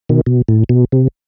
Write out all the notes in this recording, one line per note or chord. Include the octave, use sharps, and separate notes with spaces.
B2 D#3
B2
A2
B2
C3